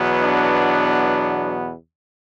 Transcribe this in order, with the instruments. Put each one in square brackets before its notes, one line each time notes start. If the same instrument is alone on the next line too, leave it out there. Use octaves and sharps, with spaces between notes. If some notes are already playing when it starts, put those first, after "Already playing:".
Already playing: [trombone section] E2 B2 F#3 B3
D4